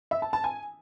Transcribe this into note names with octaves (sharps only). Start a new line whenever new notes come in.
E5
A5
A5
G#5